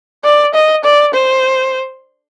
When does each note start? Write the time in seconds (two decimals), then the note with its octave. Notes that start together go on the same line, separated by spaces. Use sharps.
0.24 D5
0.54 D#5
0.84 D5
1.14 C5